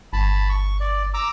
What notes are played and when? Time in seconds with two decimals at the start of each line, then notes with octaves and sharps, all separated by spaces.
0.13 G1 A5 B5
0.49 C#6
0.80 D5
1.14 A#5 D6 E6